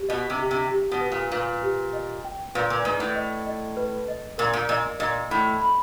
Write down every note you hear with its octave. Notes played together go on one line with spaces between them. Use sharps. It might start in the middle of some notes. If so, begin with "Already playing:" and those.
Already playing: G4
B2 D#5
C3
G4
C3
G4
B2
B4
A#2
A#2 B4
G4
D#5
G5
A#2 B4
A#2
G#2 B4
A2
D#5
D#5
B4
D#5
A#2 A#4
A#2
A#2 D#5
A#2 D#5
A2 B5
B5